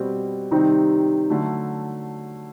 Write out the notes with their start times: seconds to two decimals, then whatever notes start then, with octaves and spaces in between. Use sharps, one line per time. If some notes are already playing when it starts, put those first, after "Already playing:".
Already playing: B2 G3 C4
0.51 C3 D#3 G3 C4 D#4
1.30 D3 F#3 A3